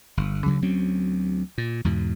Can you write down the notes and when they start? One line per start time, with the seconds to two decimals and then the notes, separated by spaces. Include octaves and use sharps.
0.17 G1
0.46 D2 C#3 F#3
0.62 D2 F#3 C4 C#4
1.58 A#2
1.84 E2 G#2 B2